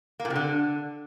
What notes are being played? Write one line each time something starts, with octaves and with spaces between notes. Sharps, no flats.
A#3
A#2
C3
D3